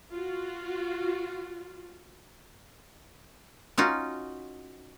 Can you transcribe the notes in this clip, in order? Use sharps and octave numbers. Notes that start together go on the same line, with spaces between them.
F4 F#4
C#4 D#4 F4 F#4